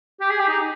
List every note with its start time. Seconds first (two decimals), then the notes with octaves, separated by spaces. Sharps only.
0.21 G4
0.30 G#4
0.39 G4
0.48 D#4